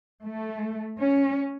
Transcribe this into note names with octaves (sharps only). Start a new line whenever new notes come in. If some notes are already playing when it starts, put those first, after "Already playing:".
A3
C#4